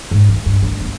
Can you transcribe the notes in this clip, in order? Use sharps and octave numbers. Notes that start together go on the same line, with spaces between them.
G#2
D#3
G2
D2
B3